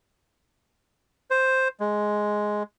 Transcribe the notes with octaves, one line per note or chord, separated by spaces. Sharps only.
C5
G#3